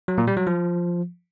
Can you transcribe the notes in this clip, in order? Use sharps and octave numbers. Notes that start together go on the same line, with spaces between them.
F#3
A#2
G3
F#3
F3